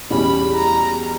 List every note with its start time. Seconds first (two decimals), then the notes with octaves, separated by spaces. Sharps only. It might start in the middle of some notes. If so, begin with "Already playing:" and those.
0.10 E2 B2 G3 C#4 B5
0.55 A#5